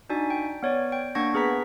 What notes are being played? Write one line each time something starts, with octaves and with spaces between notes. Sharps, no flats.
D4 D#4 F#4 D5 G#5
G5
B3 C#5 D5
G5
A#3 D4 F#5 C#6 G#6 A#6
B3 G#4 B4 A#5 B6